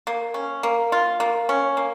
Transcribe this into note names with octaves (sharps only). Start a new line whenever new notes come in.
A#3
C#4
A#3
F4
A#3
C#4
A#3